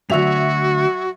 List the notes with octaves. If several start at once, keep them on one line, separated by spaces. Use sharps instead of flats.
D2 G2 F#3 F#4 E5 F7